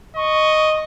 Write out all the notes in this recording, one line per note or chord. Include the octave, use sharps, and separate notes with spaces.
D#5 C#6